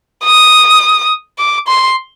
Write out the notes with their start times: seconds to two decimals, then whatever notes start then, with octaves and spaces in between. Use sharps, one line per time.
0.24 D#6
1.38 D6
1.67 C6